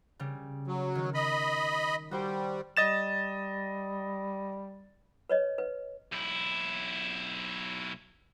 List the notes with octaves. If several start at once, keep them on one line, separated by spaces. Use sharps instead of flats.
C#3 G3
F#3
D#3
D#5 B5
G3 F#4 C5 G5
G3 D#5 A6 E7
B4 C#5 D#5
B4
B1 E4